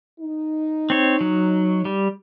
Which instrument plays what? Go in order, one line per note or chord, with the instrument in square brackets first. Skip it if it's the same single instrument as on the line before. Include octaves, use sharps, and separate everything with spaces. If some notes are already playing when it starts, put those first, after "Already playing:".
[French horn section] D#4
[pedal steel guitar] C4 C#5
F#3
G3